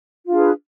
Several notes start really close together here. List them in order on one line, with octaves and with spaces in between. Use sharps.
F4 D4 G#4 B4